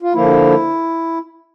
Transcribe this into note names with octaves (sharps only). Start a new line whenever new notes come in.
F4
D3 F3 A#3 E4